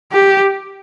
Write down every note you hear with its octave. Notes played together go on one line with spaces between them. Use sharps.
G4